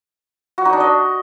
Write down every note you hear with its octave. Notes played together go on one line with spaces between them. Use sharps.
F#4
D#4
D4
D#5